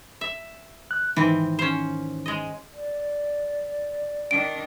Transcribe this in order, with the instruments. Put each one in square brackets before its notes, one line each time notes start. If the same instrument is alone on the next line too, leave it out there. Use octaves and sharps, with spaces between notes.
[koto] E5
[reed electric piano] F#6
[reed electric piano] G#2 D#3 [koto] E3 C4
[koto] C#4 C5
G#3 D#5
[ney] D5
[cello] D#3 D4 [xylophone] D7